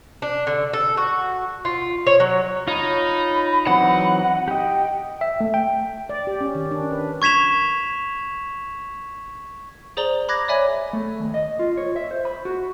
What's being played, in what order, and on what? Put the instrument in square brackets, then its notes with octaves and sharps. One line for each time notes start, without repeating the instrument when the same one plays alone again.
[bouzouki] D4
D3
A4
F#4
F4
C#5
F#3
[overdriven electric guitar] D#4 [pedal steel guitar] F4 C#5 A#5 [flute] B5
[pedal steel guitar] E3 F#3 C4 [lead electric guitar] F#5
[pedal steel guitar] G4 D#5 [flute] G5
[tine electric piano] E5
A3
G5
[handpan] D5
G4
C#4
D#3
D4
B4
[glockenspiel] C#6 G#6 B6 E7 F7
[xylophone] G#4 C5 D5 A#5 F#7 G7
B5 D6 F#6 G#6 A#6
C#5 D5 E5 G#5 B5
[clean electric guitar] A3
D#2
D#5
F4
C#5
E5
C5
B5
F#4